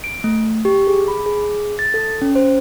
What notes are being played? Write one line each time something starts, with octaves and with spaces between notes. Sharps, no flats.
D7
A3
G4
G#4
B5
G#4
A6
A4
C#4
C5